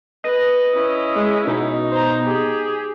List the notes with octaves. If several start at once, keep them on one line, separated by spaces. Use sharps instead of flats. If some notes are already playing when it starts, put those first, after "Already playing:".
B4 D#5
C#4 E4
G#3
B2 D#4
C5 A#5
G4 G#4